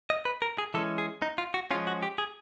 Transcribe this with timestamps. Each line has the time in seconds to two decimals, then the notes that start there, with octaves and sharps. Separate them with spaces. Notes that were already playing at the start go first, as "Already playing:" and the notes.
0.10 D#5
0.25 B4
0.42 A#4
0.58 G#4
0.74 E3 G#3 C#4 A4
0.98 G#4
1.22 D#4
1.38 F4
1.54 F#4
1.71 F3 G#3 C#4 F4
1.87 F#4
2.03 G4
2.18 G#4